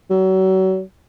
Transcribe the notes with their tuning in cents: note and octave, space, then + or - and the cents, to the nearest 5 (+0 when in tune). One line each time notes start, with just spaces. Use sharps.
F#3 +35